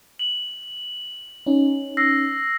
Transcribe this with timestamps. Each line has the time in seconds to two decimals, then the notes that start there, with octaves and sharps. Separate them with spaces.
0.19 F#7
1.46 C#4 D#4
1.97 E6 A#6 C7